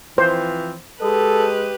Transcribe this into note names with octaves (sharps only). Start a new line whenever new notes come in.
E3 F3 C4 C5
G#3 G4 A4 B4 D#5